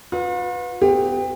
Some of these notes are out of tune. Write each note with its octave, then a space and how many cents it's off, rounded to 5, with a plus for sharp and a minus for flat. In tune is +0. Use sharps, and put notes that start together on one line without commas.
F4 +45 B4 +0
B3 +35 G4 +30